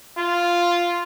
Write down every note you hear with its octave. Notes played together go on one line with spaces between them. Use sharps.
F4